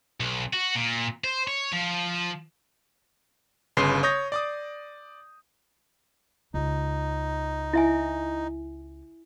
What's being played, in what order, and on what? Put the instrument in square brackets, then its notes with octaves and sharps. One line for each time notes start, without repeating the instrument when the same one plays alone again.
[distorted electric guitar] B1
F#4
A#2
C5
C#5
F3
[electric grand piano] G1 C#3 B4 C6 C7
C#5 D#6 G6 A#6
D5 D6 D#6
[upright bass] C#2 [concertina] D#4
[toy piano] E4 E5 G#5